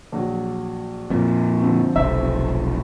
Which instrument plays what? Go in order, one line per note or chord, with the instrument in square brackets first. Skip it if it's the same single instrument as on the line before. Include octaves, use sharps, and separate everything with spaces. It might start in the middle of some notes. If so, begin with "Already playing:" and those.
[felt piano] A#1 F#3
[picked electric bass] F2 A#2
[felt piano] D3 F3 C4
[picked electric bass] F1 B1 [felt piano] C5 E5